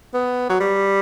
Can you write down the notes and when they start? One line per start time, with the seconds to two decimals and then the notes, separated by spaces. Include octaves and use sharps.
0.14 B3
0.49 F#3
0.60 G3